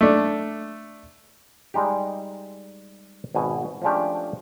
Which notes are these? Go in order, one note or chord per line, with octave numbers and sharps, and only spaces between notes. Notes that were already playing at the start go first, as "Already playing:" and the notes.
A3 D4
G3 G#3 D#4 G4
G#1 B2 G#5
F3 G#3 A3 C#4 D4 G4